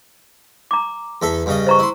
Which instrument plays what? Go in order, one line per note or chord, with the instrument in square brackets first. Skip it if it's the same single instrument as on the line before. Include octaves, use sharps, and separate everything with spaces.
[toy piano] A#5 D6
[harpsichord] E2 A4 E5
G2 C#3 D#5
[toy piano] C5 A#5 C#6
[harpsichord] E4 C6